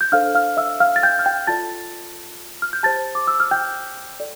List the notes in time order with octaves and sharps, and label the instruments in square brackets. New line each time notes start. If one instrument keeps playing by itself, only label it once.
[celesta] G6
D4 A4 C5 F5 F6
F5 F6
E5 E6
F5 F6
A6
G5 G6
F6
G5 G6
F4 A4 D5 A5 A6
F6
G6
G4 C5 A5 A6
D6
E6
F6
G5 G6
A4 D5